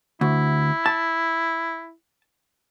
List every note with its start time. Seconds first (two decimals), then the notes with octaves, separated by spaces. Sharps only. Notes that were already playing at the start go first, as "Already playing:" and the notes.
0.21 D2 E4
0.86 A5